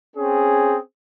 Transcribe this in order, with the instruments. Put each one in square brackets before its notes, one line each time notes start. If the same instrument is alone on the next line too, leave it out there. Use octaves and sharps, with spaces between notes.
[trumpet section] C4 C#4 G#4